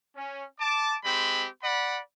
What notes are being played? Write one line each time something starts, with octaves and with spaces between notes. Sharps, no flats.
C#4
A5 D6
G#3 C4 G4 B5
D5 F#5 B5